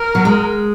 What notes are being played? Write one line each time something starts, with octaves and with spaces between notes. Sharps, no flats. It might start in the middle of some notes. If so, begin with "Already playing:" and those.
Already playing: A#4
F#3
G#3